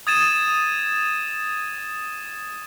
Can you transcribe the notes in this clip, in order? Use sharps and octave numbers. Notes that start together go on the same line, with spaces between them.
D#6 G#6 A6 D#7 E7